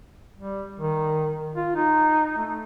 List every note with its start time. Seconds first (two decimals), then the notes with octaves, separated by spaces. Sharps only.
0.38 G3
0.80 D#3
1.55 F4
1.75 D#4
2.38 A3